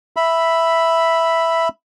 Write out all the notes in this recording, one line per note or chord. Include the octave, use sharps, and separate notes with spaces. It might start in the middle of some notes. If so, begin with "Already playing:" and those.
E5 B5